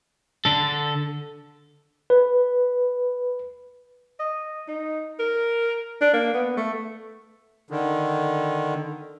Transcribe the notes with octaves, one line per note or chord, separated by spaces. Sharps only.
D3 A4
B4
D#5
D#4
A#4
D4
A#3
B3
A3
D3 D#3